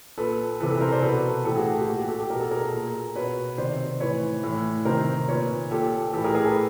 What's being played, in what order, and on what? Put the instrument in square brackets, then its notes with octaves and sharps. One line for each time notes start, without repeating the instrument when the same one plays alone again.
[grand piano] A#2 A4 B4
E3 A4 B4
C3
A4 B4
A#4 C5
C5 D5
B2 A4 B4
A2 E3 G4 A4
F#4 G#4
G4
G4
A#2 F#4
G4
G4 A4
G4 A4
B2 A#4
A4
G#4 A#4
A#2
B2 B4 C#5
C3 D#3 C5 D5
A2 E3 B4 C#5
A2 E3
C3 D#3 A#4 C5
A#2 B4 C#5
A#2 G4 A4
A2 E3 G4 A4
G#4 A#4
G#4 A#4
A4 B4